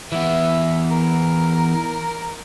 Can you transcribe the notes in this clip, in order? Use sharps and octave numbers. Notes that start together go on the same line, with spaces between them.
E3 B3 E5
A#4